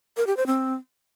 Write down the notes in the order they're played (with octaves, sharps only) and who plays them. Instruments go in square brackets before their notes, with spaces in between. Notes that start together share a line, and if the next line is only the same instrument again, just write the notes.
[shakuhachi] A#4
G4
C5
C4